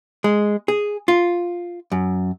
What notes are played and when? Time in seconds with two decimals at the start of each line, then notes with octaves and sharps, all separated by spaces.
0.24 G#3
0.68 G#4
1.08 F4
1.92 F#2